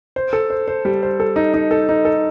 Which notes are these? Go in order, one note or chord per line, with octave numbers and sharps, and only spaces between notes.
C5
A4
C5
C5
G3
C5
A4
D#4
D#4
A4
D#4
A4